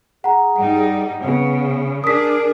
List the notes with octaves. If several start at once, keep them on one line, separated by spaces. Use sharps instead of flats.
G#4 F#5 A#5
G2 G3 D#4 F#5
C#3 B3
D4 G#4 A#4 D#6 B6